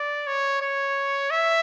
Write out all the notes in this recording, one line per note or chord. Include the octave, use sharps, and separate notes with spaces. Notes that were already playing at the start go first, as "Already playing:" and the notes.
Already playing: D5
C#5
C#5
E5